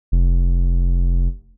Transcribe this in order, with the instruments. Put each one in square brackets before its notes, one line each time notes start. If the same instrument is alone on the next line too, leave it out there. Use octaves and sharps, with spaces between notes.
[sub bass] F1